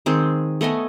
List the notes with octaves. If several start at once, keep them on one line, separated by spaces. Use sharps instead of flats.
D#3 G#3 C4 G#4
A3 B3 D#5 G#5